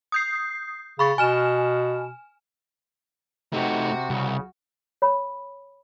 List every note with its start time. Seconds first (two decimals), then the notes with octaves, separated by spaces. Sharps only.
0.12 D#6 G6 C7
0.99 C#3 B5 C#6 A6
1.18 B2 G#5 F6 E7
3.53 C3 A3 C4 D#4 F#4
4.10 C2 C#3
5.02 C#5 B5